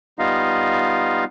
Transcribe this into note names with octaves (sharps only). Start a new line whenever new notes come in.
G3 B3 D#4 F4 D#5 F5